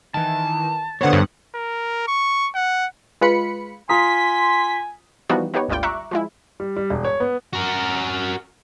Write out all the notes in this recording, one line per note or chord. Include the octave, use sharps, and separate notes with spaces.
D#3 E3 A5
D3 B3 C5 C#5 F#5
G2
A#4
C#6
F#5
G#3 F4 B4 B5 C#7
F4 G#5 A#5 C6 D#6 B6
E3 F3 G3 B3 D#4 F#4
B3 D#4 G4 B4 C#5
G#1 D2 G3 F4 D5 G5
E5 A#5 C#6 D6 F#6
F3 G#3 E4
G3
G3
E1
C#5
B3
F#4 A#4